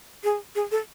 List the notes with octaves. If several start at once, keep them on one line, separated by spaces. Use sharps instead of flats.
G#4
G#4
A4